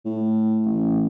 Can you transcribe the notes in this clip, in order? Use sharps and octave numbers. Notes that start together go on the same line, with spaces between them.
A2
A1